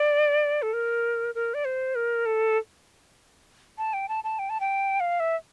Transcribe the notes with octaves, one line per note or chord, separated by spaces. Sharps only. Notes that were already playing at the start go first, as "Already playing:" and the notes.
Already playing: D5
A4
A#4
A#4
D5
C5
A#4
A4
A5
G5
A5
A5
G5
A5
G5
F5
E5